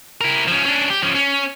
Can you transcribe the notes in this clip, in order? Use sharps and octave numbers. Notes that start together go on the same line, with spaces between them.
E4 A#4
F3 C#4
C#4 D4
G4
F3 C#4
C#4